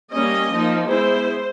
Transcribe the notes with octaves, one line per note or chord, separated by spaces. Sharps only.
G3 A#3 C#4 D#5
F3 A#3 D#4
G#3 B3 E4 C5